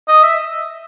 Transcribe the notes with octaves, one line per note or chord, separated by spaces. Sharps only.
D#5
E5